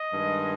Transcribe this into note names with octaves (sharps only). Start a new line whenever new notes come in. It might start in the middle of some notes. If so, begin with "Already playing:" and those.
Already playing: D#5
G2 D#3 G#3